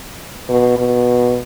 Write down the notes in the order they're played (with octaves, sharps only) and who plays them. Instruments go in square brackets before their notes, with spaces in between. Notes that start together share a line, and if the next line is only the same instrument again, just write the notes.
[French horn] B2
B2